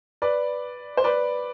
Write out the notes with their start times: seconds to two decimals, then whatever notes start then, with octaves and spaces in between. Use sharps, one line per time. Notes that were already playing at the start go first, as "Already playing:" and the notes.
0.22 B4 D5
0.97 C5
1.04 B4 D5